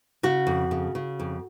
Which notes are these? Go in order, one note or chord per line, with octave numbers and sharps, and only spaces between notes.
C#3 F#4
F2
C#3
C#3
F2